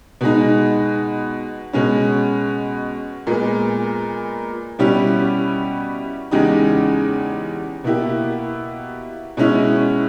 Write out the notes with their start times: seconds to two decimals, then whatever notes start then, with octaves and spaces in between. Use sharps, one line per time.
0.21 B2 G#3 D#4
1.73 B2 G#3 C#4
3.27 A#2 G#3 B3
4.79 B2 G3 C#4 E4 G4
6.31 E2 C#3 G#3 D#4 G4
7.84 B2 A#3 E4 G4
9.37 B2 G#3 C#4 E4